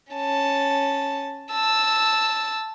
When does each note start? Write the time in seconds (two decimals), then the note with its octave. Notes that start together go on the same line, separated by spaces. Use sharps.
0.12 C#4 A5
1.53 A5 E6